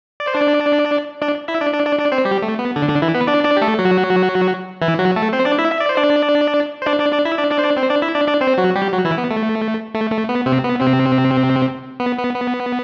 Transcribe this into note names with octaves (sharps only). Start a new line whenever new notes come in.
D5
C5
D4 D5
D4 D5
E4 E5
D4 D5
D4 D5
D4 D5
D4 D5
C4 C5
G3 G4
A3
B3
D3 D4
D3 D4
E3 E4
B3 B4
D4 D5
D4 D5
G4
A3 A4
F#3 F#4
E3 E4
F#3 F#4
A3 A4
C4 C5
D4 D5
E4 E5
E5
D5
C5
D4 D5
C5
D4 D5
D4 D5
D4 D5
E4 E5
D4 D5
D4 D5
C5
D4 D5
C4 C5
D4 D5
E4 E5
D4 D5
D4 D5
C4 C5
F#3 F#4
G3 G4
F#3 F#4
E3 E4
B3
A3
A3
A3
B3
C3 C4
B3
C3 C4
B3
B3
B3